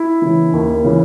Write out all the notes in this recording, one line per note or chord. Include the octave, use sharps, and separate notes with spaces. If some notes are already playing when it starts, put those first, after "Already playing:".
Already playing: E4
C#3 E3
D#2
C#3 E3